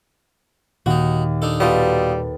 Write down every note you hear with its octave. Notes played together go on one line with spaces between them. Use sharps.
D#2 A#2 D#4 F#4
D4 D#4 A4
B2 G3 F4 A4 B4 D#5